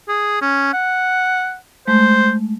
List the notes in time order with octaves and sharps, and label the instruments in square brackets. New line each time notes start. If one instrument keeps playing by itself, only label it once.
[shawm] G#4
C#4
F#5
[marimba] G#3 A3 [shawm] C5